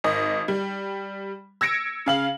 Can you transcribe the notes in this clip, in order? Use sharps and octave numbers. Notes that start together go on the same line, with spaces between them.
G#1 D#5
G3
E6 G#6 A#6 C#7 D7
C#3 F5 F#7